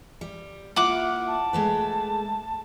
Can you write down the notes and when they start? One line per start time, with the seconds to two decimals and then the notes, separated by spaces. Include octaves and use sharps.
0.21 G3
0.76 A#3 E4 F4 F#5 D6
1.28 A5
1.53 G#3 A3 B4